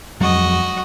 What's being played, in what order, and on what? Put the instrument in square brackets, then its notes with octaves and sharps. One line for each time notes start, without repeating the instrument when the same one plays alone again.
[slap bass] F2 F#3 G#3 [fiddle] F#4 D#5